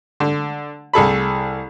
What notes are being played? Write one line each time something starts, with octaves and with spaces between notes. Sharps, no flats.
D3
C2 G#4 A4 B5